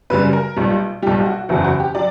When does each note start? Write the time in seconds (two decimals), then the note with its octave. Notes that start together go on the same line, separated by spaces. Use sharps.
0.10 F#2 C#3 G3 B4
0.33 A#4
0.56 B1 A#2 G3
1.02 B1 A#2 G3 G4
1.26 F#4
1.49 F#1 E2 B2 F#3 F#4
1.64 F#4
1.80 G4
1.95 F#3 D5